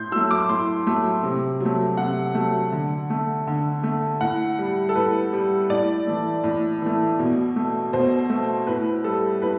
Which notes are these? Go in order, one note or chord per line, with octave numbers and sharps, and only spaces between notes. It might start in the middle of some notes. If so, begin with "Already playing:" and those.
Already playing: A2 C6 G6
F#3 A3 E6
D6
A2 C6
F#3 A3
C3
F#3 A3
C3 F#5
F#3 A3
D3
A3
D3
A3
A2 F#5
G3
A4
A2 B4
G3
A2 D5
E3 A3
A2
E3 A3
B2
A3
B2 C5
A3
A2 B4
G3 A4
A2 B4